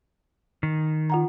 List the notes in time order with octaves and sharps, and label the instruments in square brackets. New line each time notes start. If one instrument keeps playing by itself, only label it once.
[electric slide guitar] D#3
[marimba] F4 F#5 A#5